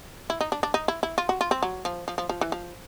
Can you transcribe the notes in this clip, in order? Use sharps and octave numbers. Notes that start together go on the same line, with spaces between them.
E4
D#4
D4
D4
D#4
E4
E4
F4
F#4
F4
C4
F#3
F3
F3
F3
F3
E3
F3